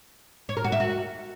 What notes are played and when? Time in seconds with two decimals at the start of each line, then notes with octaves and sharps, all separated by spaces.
0.49 C#5
0.57 A#4
0.64 F#4
0.72 E5
0.80 F#4